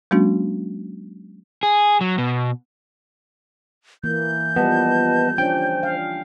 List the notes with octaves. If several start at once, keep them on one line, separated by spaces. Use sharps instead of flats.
F#3 G#3 A#3 C#4 D4 F#4
G#4
F#3
B2
E3 A#3 G6
F3 G3 B3 B4 D#5 A5
C#4 D4 C5 G5
F5